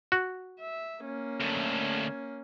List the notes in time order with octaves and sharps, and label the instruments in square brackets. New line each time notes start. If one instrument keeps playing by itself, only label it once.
[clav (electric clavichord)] F#4
[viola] E5
A#3 C#4
[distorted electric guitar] D2 A2